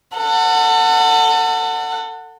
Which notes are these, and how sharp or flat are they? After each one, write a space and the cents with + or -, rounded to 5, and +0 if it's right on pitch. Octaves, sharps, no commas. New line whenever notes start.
A4 +35 F#5 +0